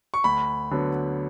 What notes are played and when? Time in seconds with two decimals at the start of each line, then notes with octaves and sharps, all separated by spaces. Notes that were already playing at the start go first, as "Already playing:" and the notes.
0.14 C#6
0.24 D2 B5
0.71 D3 F#3 B3